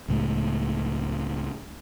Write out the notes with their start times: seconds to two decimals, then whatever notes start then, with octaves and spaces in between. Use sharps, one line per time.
0.08 C#2 A2 G#3